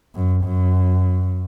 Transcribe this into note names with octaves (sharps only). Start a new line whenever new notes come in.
F#2
F#2